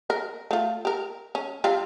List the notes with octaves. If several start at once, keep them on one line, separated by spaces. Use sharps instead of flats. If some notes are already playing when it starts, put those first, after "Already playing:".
A#4
A3 F4
G4 A#4
C#4
G3 C4 F4